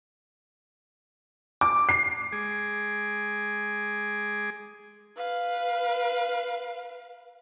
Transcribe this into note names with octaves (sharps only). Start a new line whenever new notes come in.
D6
C7
G#3 G#4 D6
B4 F5